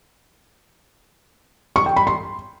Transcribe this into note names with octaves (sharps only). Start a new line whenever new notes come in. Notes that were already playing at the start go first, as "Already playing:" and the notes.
C#6
G5
B5
C6